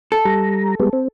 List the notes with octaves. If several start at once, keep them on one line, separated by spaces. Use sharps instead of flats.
A4
G3 A#5
G3 G#3 B3
C4